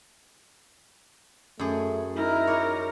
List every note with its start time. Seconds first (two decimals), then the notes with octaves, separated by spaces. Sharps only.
1.59 F#2 A3 G#4
2.16 D#4 E4 A#4
2.47 C#5 D5